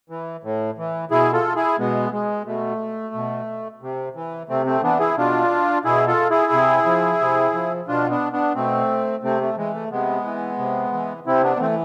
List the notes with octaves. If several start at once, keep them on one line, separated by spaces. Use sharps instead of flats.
E3
A2
E3
B2 E4 G#4
F4 A4
E4 G#4
B2 G#3 B3
G#3
B2 A3
B2
C3
E3
C3 A3 C4
A3 C4
E3 B3 D4
E4 G#4
B2 D4 F4
B2 E4 G#4
F4 A4
E4 G#4
C3
F3
C3
F3
B2 D4 F4
B3 D4
B3 D4
B2 A3 C4
C3 A3 C4
A3
E3 G#3
A3
C3 G#3 B3
E3
C3
E3
C3 C4 E4
B3 D4
B3
E3 A3 C4